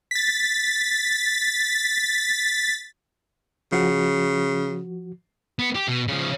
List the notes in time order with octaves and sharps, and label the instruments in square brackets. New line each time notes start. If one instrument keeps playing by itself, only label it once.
[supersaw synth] A6 B6
[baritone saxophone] C#3 [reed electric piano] F3 F#4
[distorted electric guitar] B3
G4
B2
C#3 F3